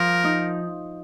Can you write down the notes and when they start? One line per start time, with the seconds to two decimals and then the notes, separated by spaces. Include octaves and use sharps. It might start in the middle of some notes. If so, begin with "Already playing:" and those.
Already playing: F3 A#4
0.24 D#4